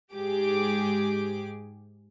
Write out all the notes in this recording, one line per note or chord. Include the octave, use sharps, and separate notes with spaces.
G#2 G4 G#4 D6